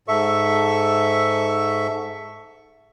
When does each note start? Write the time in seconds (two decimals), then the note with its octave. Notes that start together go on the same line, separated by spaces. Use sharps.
0.08 G#2 A4 E5 C#6